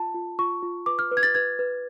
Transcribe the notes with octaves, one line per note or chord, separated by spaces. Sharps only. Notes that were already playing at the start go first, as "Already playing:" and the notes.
Already playing: F4 A5
F4
F4 C#6
F4
B4 D6
F6
B4
G#6
A6
B4 G#6
B4